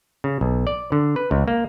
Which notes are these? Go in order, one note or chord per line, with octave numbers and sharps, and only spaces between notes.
C#3
B1
D5
D3
B4
C#2
A#3